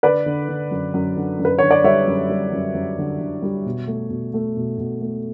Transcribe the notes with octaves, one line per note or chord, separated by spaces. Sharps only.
D3 B4 D5
D3
D3
F#2
F#2
D3
F#2
B4
D3 C#5
D5
G3 C#5 E5
F#2
G3
F#2
F#2
D3
D3
G3
B2
A3
B2
A3
B2
B2
A3